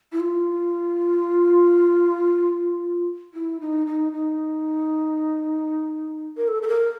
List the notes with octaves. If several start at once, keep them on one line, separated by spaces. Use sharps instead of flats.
E4
F4
E4
D#4
D#4
D#4
A#4
A4
A4
A#4